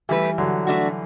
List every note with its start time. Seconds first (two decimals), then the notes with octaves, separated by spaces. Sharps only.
0.09 E3 G3 A3 E4 B4
0.38 D3 F#3
0.67 A3 D4 F#4